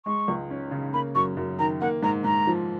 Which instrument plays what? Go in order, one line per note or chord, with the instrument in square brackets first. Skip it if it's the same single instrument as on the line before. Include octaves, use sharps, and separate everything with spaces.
[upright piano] G#3 [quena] C#6
[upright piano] C#2
C#4
C#3
[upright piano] A#3 [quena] B5
[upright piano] F#2 [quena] C#6
[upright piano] F#2
[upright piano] D#3 [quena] A#5
[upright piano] A#3 [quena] F#5
[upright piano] G#2 [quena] A#5
[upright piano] G#2 [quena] A#5
[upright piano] F3